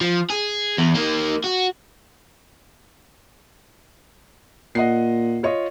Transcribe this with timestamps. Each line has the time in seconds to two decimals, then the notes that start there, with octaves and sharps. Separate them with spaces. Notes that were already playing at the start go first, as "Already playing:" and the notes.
0.01 F3
0.30 G#4
0.78 E2
0.95 D#3 A#3
1.44 F#4
4.75 A#2 D#5 F#5 C7
5.43 F4 C#5 D#5